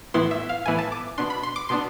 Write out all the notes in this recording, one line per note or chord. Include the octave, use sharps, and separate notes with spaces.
A2 E3 B3 E4 C6
E5
F5
A2 E3 B3 E4 G#5
A5
D6
B2 B3 D4 C6
B5
C6
D6
B2 B3 D4 C6